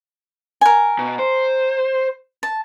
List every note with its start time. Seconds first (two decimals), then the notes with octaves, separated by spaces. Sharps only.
0.61 A#4 G#5
0.98 B2
1.19 C5
2.43 A5